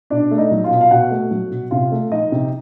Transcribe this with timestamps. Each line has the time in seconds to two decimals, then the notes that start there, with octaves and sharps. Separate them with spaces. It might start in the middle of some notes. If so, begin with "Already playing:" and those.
0.10 B2 D4 D5
0.31 A3
0.38 D#4 D#5
0.51 F#3
0.64 F4 F5
0.71 B2
0.81 F5
0.91 B2 F#4 F#5
1.11 A3
1.31 F#3
1.51 B2
1.71 C3 F4 F5
1.92 A3
2.11 F3 D#4 D#5
2.32 C3